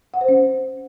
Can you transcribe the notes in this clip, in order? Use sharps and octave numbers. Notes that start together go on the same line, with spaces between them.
F#5
C5
C#4